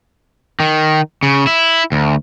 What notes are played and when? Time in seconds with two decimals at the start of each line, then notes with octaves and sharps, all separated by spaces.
0.60 D#3
1.23 C#3
1.47 E4
1.92 D2